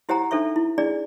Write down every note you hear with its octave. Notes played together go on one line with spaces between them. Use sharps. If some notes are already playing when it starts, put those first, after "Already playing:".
E4 G4 C5 F#5 G#5 A#5
D4 D#4 A4 C5 E5 C#6
E4
D4 E4 G#4 D5